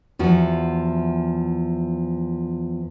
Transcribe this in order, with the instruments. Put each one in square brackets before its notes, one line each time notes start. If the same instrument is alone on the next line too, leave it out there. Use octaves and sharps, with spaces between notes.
[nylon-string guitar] E2 F3 F#4